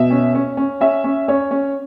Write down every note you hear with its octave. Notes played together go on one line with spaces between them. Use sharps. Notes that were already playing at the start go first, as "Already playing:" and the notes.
Already playing: B2 E5
C#4
C#4
C#4
C#4 E5
C#4
C#4 C#5
C#4